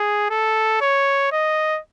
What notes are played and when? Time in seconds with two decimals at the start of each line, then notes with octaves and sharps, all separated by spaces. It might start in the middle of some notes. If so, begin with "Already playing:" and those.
Already playing: G#4
0.30 A4
0.81 C#5
1.32 D#5